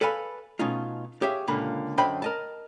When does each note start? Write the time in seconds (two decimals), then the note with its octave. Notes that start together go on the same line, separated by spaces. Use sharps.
0.01 A4 B4 D5 F5 G#5 B5
0.59 B2 A3 C#4 D#4 F4
1.22 G4 G#4 C#5 E5 F5
1.47 C#2 A#2 D3 A#3 B5
1.97 F#2 D3 C5 D#5 G5 B5
2.22 A#4 D#5 A5